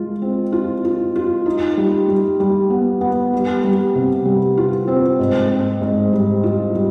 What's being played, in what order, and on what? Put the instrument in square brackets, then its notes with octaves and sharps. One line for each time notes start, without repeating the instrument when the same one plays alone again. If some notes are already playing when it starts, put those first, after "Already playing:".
Already playing: [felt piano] G#3 F4
C4
F4
F4
F4
D#4
G3
G3
G3
B3
B3
G3
G3
C3
G3
F4
C4
G#2
C4
G#2
G3
F4
G3